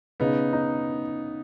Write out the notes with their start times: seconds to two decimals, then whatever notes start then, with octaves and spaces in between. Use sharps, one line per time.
0.20 C#3 B3 D#4
0.53 D#4